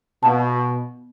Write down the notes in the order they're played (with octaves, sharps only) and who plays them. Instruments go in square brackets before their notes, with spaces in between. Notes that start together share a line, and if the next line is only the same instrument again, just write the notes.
[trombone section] B2 [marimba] B3 F5 A5